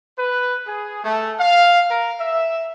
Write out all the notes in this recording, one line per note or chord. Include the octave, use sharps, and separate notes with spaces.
B4
G#4
A3
F5
A#4
E5